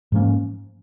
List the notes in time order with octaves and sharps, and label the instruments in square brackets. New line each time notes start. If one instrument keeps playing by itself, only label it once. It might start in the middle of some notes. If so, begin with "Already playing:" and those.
[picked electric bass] G#2 F3 A#3 C#4